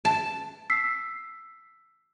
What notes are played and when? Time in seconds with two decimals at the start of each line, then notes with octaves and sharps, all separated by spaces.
0.05 A5
0.70 E6 B6 C7